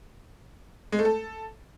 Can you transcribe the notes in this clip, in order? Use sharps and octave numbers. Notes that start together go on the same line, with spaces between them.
G#3
A3
A4